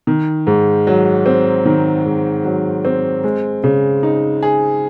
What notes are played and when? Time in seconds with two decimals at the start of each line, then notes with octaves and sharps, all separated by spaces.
0.07 D#3
0.47 G#2
0.87 F#3
1.26 C4
1.65 D#3
2.05 G#2
2.44 F#3
2.85 C4
3.24 G#3
3.64 C#3
4.03 D#4
4.43 G#4